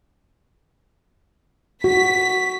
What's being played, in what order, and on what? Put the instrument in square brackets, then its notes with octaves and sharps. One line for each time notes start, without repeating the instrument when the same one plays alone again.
[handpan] F#4 [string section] B6